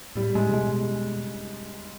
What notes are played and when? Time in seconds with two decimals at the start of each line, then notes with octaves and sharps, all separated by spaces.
0.16 A2 G3
0.35 A2 G#3
0.49 C3
0.53 B2 G#3